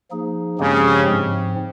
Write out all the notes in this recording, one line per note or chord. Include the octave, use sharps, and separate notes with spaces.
F3 A#3 D#4 G#4
G2 C#3 F3 G#3 C4 G4
G#2 F3 C4